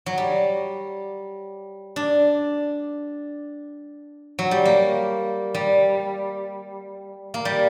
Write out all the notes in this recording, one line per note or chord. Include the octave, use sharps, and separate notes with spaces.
F#3
G3
D4
F#3
G3
A#3
G3
A#3
G3